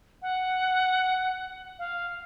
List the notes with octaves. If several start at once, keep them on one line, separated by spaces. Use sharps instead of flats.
F#5
F5